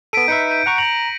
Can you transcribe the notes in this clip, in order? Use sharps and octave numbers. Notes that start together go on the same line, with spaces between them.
B3 A4 B6 D7 D#7
D#4 B4 E5 G6 C#7
G6 D#7
F#5 A#5 C#6
A#5 A#6 F#7